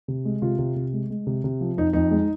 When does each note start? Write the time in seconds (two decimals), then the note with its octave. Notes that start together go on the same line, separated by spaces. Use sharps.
0.08 C3
0.25 G#3
0.42 C3 F4
0.59 C3
0.76 C3
0.93 G#3
1.10 G#3
1.27 C3
1.44 C3
1.61 F3
1.78 F2 D#4
1.93 F2 D#4
2.11 G#3